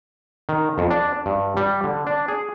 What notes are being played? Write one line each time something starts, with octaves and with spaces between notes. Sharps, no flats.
D#3
F2
D4
G2
G3
D3
D4
G#4